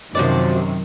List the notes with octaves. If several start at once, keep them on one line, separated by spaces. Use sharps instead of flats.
F#2 C3 D#3 F3 F#4 D5